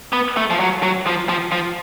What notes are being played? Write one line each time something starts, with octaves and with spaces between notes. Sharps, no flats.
B3
A3
F3
F#3
F#3
F3
F3
F3